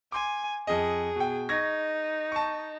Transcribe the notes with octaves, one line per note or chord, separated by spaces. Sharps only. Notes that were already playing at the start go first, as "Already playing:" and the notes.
G#5 C6 D6
F2 G#4 D#5
B2 G5
D#4 C#6 G#6 A#6
A5 C#6